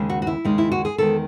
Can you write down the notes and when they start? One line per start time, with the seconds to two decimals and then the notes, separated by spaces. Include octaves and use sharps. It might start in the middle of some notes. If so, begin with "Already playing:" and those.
Already playing: D#2 C#3 G#3
0.10 F#4
0.22 F#4
0.27 E4
0.45 D#2 C#3 G#3 D#4
0.58 E4
0.72 F#4
0.85 G#4
0.98 E2 D#3 G#3 A4